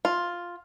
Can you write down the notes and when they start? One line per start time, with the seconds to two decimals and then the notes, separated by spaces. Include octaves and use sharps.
0.05 F4